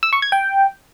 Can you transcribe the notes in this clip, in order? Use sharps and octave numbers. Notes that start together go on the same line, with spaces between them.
E6
C#6
G#6
G5